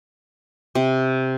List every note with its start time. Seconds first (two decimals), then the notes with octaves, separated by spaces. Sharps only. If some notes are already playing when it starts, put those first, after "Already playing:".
0.75 C3